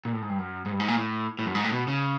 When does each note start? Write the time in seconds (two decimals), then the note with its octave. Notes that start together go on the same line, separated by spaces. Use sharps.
0.05 A#2
0.13 A2
0.22 G#2
0.29 G2
0.39 F#2
0.66 G#2
0.72 G2
0.80 G#2
0.88 A#2
0.97 A2
1.39 A2
1.46 F#2
1.55 G#2
1.64 A2
1.72 B2
1.88 C#3